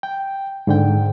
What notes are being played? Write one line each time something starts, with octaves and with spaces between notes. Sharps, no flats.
G5
G#2 D3 G5